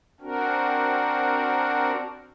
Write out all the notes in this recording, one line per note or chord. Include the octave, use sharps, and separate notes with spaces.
C4 D4 F#4 A#4